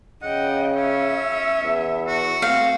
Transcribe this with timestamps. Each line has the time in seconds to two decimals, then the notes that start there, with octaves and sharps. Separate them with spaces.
0.23 C#3 D#5 F#5 G5
0.77 C#4 E5
1.63 E2
2.07 F#4
2.42 A3 C4 F5